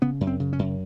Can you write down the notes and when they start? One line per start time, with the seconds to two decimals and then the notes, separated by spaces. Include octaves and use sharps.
0.02 C#3 B3
0.21 F#2
0.27 C4
0.40 C#3
0.53 C#4
0.59 F#2